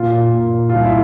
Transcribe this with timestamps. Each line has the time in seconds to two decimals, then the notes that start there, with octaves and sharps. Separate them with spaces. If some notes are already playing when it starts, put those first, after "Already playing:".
Already playing: A#2 F4
0.12 A#2
0.33 A#2
0.54 A#2
0.69 C2 F4
0.84 E4